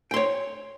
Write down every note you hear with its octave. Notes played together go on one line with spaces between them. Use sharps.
C#5 G5 C6